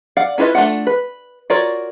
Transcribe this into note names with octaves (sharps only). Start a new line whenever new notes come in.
D5 F5 F#5
C#4 E4 F4 B4 D#5
A3 A#3 D4 F4 F#5
B4
F4 F#4 A#4 C#5 D5